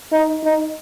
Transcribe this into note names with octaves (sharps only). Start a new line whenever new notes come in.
D#4
D#4